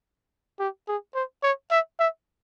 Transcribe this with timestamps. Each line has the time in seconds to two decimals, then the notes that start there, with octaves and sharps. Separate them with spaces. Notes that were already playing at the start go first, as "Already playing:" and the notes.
0.59 G4
0.88 G#4
1.15 C5
1.43 C#5
1.71 E5
1.99 E5